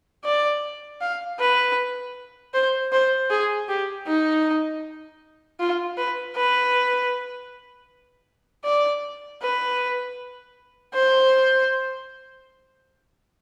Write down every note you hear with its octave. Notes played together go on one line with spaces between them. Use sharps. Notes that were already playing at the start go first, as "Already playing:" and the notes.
D5
F5
B4
C5
C5
G#4
G4
D#4
F4
B4
B4
D5
B4
C5